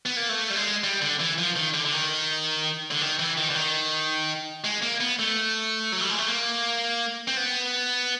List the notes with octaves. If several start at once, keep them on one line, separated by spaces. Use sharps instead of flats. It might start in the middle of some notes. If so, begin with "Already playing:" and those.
B3
A#3
A3
G3
G#3
G3
D3
E3
F3
D#3
D3
D3
D#3
D3
D#3
E3
D#3
D3
D#3
G#3
A#3
B3
A3
F#3
G3
G#3
A3
A#3
C4
B3